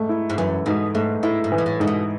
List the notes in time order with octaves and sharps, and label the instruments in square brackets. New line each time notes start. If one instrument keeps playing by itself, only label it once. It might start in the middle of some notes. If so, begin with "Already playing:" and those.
Already playing: [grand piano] G#2 A3
E4
[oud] G#2
[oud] F#2 [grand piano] E3
[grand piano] G#2 [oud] B2
[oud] G#2 [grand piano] A3
[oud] A2 [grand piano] E4
[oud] G#2
[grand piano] E3
[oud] B2
A2
[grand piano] G#2 [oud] C#3
[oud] B2